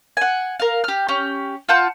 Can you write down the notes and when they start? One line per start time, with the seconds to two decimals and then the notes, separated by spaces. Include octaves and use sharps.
0.17 F#5 G#5
0.59 A#4 F5
0.84 G4 F6
1.08 C#4 G4
1.69 F4 F#5 A5 G6